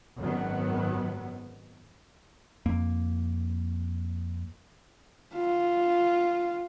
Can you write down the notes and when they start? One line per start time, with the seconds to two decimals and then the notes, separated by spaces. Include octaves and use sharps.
0.18 G#1 F#2 D#3 F#3 B3
2.66 F2 A#3
5.35 F4